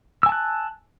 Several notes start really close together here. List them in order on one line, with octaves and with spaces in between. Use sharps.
E6 G#5 A5 F#6